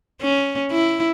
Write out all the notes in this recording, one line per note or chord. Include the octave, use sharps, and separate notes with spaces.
C#4
E4